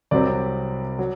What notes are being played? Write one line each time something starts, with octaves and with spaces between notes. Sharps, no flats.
C2 C3 F#3 C4 D5
F#3